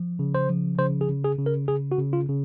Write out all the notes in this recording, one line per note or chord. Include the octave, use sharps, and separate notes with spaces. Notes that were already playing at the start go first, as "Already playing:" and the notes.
Already playing: F3
C#3
C5
F3
C#3 C5
G#4
C#3
G#4
C#3
A#4
C#3 G#4
F#4
C#3
F4
C#3